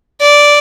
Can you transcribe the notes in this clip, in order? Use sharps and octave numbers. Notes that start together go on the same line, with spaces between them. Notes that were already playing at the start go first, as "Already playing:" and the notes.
D5